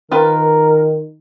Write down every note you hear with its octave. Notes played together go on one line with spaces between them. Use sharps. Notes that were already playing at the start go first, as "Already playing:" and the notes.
D#3 F4 A#4 B4 G5